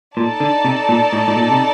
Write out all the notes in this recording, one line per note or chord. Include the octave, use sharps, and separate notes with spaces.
A#2 D#4 A4 D5 A5
D3
C3
A#2
A2
A2
A#2
C3